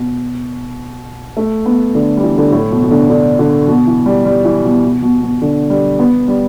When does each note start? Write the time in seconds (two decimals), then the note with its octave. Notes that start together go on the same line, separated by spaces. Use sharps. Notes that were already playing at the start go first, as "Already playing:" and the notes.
Already playing: B2
1.37 A3
1.66 B3
1.95 D3
2.17 G3
2.23 E3
2.38 D3
2.52 A2
2.71 B2
2.82 B2
2.91 D3
3.10 D3
3.39 D3
3.67 B2
3.87 E3
4.06 G3
4.25 G3
4.45 E3
4.64 B2
4.84 B2
5.02 B2
5.21 B2
5.42 D3
5.70 G3
5.99 B3
6.28 G3